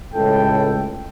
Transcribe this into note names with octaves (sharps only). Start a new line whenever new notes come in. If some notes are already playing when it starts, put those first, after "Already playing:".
C#2 A2 A4 G5